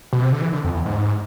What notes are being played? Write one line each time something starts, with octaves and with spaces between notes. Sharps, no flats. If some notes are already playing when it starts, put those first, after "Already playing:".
B2
C3
D3
E3
D3
F2
E2
G#2